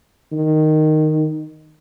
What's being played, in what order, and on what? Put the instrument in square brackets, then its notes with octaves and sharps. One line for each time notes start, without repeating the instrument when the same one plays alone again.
[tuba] D#3